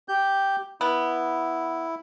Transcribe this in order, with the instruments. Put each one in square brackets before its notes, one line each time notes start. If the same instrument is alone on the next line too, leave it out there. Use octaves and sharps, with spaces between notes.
[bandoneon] G4 G6
[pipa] B3 [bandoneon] E4